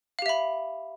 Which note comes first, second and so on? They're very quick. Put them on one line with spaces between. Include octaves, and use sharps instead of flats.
F5 G4 E5 B5